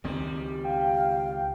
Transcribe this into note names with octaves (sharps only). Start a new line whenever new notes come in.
C#2 D#3 G3 C4
F5 G5